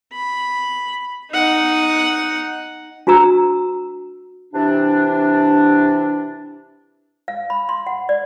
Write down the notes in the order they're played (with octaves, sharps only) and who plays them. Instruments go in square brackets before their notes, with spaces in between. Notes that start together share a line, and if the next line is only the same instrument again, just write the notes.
[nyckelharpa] B5
D#4 F#5
[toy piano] D4 F#4 B4 A#5 E6
[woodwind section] C3 E3 D4
[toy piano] F5
B5
C6
F#5
D5